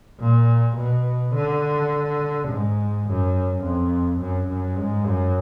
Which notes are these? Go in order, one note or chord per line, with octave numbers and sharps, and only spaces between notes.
A#2
B2
D3
G#2
F#2
F2
F#2
F#2
G#2
F#2